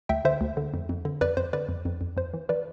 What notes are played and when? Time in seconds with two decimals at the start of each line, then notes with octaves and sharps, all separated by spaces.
0.09 D2 E5 G5
0.25 D3 C5 E5
0.41 D2
0.57 D3
0.74 F2
0.89 F2
1.05 D3
1.21 F2 B4 D5
1.37 F2 C5
1.53 D3 B4 D5
1.69 F2
1.85 F2
2.01 F2
2.17 F2 C5
2.34 E3
2.49 E3 B4 D5